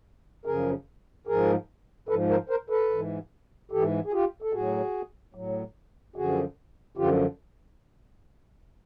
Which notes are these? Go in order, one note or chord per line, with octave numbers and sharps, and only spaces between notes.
F#2 C#3 F3 G#4 A#4
G#2 F3 G#4 A#4
G#2 F3 A4 B4
A#4 C5
A#4 C5
A4 B4
G#2 E3
G#2 E3 G4 A4
G#4
F4 G4
A4
A2 F#3 F#4 G#4
A2 F#3
F#2 D3 F3 F#4 G#4
F#2 D3 F3 F4 G4